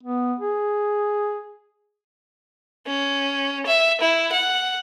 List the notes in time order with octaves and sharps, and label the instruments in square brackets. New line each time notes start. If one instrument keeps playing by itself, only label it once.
[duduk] B3
G#4
[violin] C#4
E5
E4
F#5